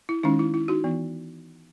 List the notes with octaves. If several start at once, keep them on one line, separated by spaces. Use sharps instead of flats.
E4
D#3 G#3 C#4 D#4
E4
E4
D#4 F#4
E3 B3